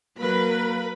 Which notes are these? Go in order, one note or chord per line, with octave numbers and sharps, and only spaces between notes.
F#3 A#3 A#4 B4 B5